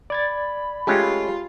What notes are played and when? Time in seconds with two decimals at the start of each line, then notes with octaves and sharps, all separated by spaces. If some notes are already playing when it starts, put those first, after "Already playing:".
0.10 D5 B5 G#6 A6
0.87 G#3 A3 C#4 F4 G4